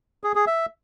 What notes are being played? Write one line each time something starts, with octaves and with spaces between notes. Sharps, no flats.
G#4
G#4
E5